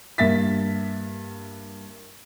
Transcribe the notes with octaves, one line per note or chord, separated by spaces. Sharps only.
G2 A#3 E5 A6 B6